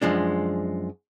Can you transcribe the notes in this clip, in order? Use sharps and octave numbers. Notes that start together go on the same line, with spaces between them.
F#2 F3 G#3 D4